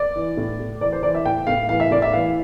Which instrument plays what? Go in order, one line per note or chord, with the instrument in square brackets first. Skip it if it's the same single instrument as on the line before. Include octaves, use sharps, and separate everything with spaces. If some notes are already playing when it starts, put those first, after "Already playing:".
Already playing: [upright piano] D5
E3
A2
A2
E3 D5
C5
E3 D5
E5
A2 G5
A2 F5
E3 F5
E5
A2 D5
E5
E3 F5